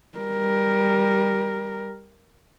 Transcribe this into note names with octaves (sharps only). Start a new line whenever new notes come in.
G3 A#4